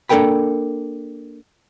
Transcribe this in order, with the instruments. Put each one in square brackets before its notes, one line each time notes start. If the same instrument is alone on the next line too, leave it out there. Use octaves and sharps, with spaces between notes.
[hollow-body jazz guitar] A#3 D4 A4 A#4 G5 B5